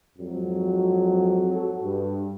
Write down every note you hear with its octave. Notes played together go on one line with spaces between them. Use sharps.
F2 G#2 F#3
F#4 A4
G2